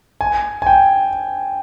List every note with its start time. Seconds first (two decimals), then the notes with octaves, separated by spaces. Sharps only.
0.21 G#5
0.62 G#5
0.67 G5